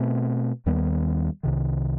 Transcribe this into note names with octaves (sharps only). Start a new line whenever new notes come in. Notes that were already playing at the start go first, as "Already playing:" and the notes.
Already playing: B2 A3 C4
D#2 D#3 G3 B3
C2 C3 D#3